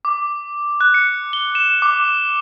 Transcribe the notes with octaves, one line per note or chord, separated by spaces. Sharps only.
D6
F#6
C#7
G7
E7
D6